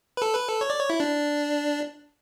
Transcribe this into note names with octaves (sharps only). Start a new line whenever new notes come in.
B4
A4
B4
A4
C#5
D5
C#5
E4
D4